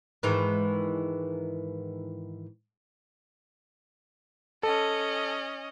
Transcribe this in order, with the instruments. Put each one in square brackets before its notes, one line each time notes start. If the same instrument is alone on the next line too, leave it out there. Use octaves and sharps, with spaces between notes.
[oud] G#2 D#3 E3
[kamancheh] C#4 D#5 [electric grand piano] A4